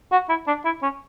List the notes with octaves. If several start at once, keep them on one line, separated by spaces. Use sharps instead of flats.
F#4
E4
D4
E4
C#4